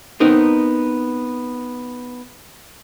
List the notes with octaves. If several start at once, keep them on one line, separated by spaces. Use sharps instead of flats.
B3 C4 D#4 A#4